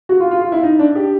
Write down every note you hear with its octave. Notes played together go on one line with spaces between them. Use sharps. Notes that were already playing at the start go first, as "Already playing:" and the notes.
F#4
F4
F4
F4
E4
D#4
D4
G4